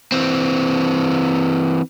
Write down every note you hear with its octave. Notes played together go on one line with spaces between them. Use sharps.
E3 C4